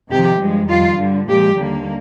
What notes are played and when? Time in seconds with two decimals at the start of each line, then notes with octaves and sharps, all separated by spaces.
0.11 F2 C3 D#3 G4
0.40 G2 F3 G#3
0.69 F2 D#3 G3 F4
0.98 G2 D3 G3
1.28 A#2 F3 G#3 G4
1.58 D#2 D3 G3 A#3